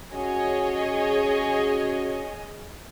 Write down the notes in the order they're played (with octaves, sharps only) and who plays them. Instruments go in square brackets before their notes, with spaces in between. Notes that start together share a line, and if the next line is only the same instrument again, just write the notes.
[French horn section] C#4 F#4 [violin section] G#4 C#5 D#5